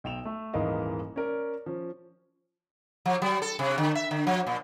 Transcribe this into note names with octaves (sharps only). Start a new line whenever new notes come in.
B1 G5 E7 F7
A3
D#1 G#2 E3 A#4 D#5 F5
C#4 A#4 D5
F3 C#4
F3
F#3
A4
C3
D3
E5
D3
F3
A#2